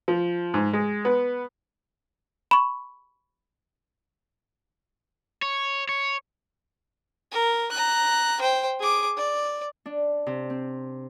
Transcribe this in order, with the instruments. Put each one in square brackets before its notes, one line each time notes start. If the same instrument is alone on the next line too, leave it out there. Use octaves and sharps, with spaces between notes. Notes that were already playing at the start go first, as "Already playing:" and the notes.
[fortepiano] F3
G#2
G#3
B3
[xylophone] B5 C#6
[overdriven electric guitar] C#5
C#5
[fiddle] A#4
A#5 F#6
C5 G5
G#4 D6
D5
[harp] D4
C3
C4